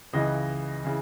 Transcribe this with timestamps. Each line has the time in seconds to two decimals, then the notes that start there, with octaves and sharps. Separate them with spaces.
0.13 C#2 C#3 E3 D#5
0.85 C#3 E3